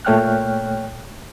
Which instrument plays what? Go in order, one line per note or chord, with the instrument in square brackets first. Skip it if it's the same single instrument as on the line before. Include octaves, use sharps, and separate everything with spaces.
[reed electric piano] A#2 A3 C#5 G5 F6 F#6